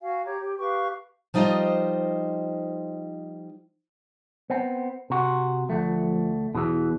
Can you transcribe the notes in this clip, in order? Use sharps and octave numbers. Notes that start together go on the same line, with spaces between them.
F#4 F5 G#5
G4 C#5 A#5
G4
G4 B4 F5 C#6
F3 G3 D#4 F4 C5 D#5
B3 C4
C3 F#4
D2 F3 A3
E2 B2 E3